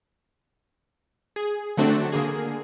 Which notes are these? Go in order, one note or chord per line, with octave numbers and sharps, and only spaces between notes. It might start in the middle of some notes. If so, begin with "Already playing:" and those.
G#4
D3 F#3 A3 C4 D4 F#4
D3 A#3 G#4